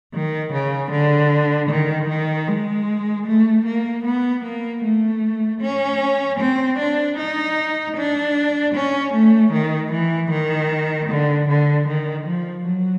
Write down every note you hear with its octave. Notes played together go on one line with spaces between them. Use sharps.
D#3
C#3
D3
D#3
D#3
G#3
A3
A#3
B3
A#3
A3
C#4
C4
D4
D#4
D4
C#4
A3
D#3
E3
D#3
D3
D3
D#3
F3
F#3